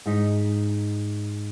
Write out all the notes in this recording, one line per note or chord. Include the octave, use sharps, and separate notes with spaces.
G#2 D#4 B6 C#7